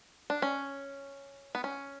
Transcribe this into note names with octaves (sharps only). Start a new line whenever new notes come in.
D4
C#4
B3
C#4